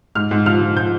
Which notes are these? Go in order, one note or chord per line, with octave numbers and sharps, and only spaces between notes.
G#2 F6
G#2
F3 F6
F3
F3 G6